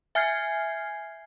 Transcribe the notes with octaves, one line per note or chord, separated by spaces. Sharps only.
E5 G#5 F6 G6 G#6 C7